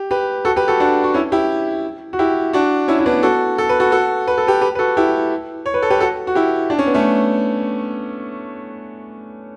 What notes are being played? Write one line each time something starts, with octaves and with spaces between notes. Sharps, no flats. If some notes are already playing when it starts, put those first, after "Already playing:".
Already playing: G4
G4 B4
F#4 A4
G4 B4
F#4 A4
D4 F#4
F#4
C#4 E4
E4 G4
F#4
E4 G4
D4 F#4
C#4 E4
E4
B3 D4
F#4 A4
A4
B4
F#4 A4
F#4 A4
B4
A4
G4 B4
G4 B4
B4
F#4 A4
E4 G4
C#5
B4
A4
G4 B4
F#4 A4
F#4
E4 G4
D4
C#4
B3
A3 C#4